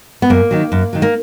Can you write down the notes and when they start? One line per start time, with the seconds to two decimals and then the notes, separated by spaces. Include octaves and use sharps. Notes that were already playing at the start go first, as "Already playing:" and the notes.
0.22 B3
0.30 F#2 A#3
0.51 D#3 F#3
0.72 F#2
0.93 D#3 F#3
1.02 A#3